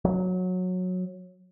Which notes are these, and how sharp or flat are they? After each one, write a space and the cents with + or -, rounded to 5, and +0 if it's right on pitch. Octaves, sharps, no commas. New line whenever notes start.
F#3 -15